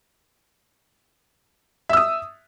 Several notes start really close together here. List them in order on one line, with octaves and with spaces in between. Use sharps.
E5 E6 D#6